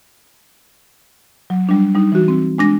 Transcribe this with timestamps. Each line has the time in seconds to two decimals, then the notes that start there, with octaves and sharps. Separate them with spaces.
1.50 F#3
1.69 G3 D4
1.95 G3 D#4
2.12 E3 F#4
2.28 C4
2.58 G#3 D4 A#6